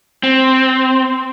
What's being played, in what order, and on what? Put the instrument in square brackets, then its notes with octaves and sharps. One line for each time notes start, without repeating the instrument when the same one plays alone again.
[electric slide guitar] C4